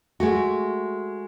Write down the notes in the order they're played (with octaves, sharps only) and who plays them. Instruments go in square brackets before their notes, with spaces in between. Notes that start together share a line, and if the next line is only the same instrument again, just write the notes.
[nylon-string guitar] G#3 A3 F#4